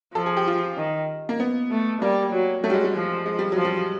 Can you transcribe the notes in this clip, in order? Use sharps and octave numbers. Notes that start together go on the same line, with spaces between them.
F3 A4
G#4
G4
F4
D#3
A#3
B3
A3
G3 A#3
F#3
F#3 A3
G3
G#3
G3
F3
G#3
G3
F#3
F3
G3